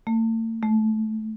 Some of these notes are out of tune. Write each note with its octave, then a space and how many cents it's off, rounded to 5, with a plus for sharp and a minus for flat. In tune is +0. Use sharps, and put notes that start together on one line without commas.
A3 +45
A3 -15